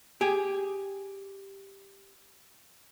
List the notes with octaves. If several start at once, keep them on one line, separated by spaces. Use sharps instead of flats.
G4 G#4